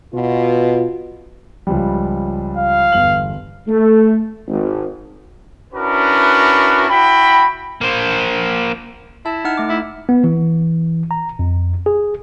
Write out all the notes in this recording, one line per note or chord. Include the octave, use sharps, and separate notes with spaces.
B2 F4
C#2 F3 G3
F5
G1 E2 F#7
A3
G#1
C#4 D4 E4 F#4 A#4 B4
E4 F#4 G5 B5
A#3 C5
E4 A5
D#4 F#5 F6
A3 D6
E4
B3
E3
A#5
F2
G#4